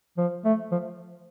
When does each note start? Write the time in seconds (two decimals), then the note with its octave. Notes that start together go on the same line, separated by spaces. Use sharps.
0.18 F3
0.45 A3
0.71 F3